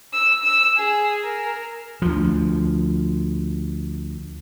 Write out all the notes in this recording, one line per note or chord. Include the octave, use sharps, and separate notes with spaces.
E6
E6
G#4
A#4
D2 F3